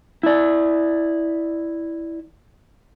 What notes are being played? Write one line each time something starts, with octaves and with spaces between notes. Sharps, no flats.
E4 D5